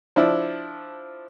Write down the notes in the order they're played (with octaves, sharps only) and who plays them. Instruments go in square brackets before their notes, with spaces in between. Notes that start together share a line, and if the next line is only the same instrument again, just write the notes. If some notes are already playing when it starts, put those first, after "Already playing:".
[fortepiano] F3 D4 E4